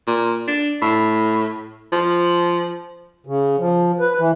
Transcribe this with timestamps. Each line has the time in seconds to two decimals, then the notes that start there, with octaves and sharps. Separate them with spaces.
0.07 A#2
0.47 D4
0.82 A2
1.92 F3
3.27 C#3
3.58 F3
4.00 B4
4.19 E3